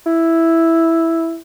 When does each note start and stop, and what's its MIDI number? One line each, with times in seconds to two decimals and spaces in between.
0.06 1.36 64